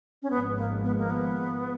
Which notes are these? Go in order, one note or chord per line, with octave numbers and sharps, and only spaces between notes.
C#4
G#1 G#2 F3 G#3 B3
A#3
B3
A#3
B3